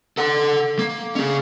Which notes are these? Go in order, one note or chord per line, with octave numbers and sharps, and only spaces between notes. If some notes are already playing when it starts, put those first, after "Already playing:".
A4 F#5
A#3
C#4 G#4